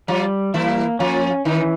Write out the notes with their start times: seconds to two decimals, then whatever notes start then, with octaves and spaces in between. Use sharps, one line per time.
0.08 F3 G3 F4
0.54 E3 A#3 E4
0.99 F3 C#4 F4
1.45 D#3 E3 D#4